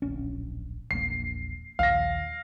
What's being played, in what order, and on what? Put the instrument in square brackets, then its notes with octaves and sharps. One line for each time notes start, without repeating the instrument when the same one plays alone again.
[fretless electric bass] D1 A#1 C#4
[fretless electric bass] E1 A#1 A#3 [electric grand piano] C7
[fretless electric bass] A#1 D#2 [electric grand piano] F5 A#6